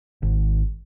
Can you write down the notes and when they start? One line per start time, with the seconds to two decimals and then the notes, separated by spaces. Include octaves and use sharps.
0.23 G#1